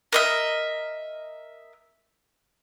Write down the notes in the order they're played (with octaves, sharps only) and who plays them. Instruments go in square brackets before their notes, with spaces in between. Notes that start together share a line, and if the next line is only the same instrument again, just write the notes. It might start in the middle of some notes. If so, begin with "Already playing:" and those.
[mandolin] A#4 D#5 E5